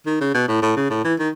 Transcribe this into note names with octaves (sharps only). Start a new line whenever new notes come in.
D#3
C#3
B2
A2
A2
C#3
A2
E3
D#3